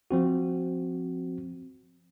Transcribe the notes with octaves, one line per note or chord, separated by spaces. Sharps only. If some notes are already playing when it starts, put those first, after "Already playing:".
F3 C4 F#4